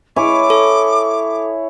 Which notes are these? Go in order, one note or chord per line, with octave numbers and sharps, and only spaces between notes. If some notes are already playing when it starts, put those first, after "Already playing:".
E4 C#5 G#5 D6
A4